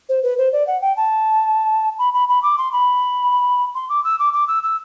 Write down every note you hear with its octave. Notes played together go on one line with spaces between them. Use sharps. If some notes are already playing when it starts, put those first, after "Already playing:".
C5
B4
C5
D5
F#5
G5
A5
B5
B5
B5
D6
C6
B5
C6
D6
E6
D6
D6
E6
E6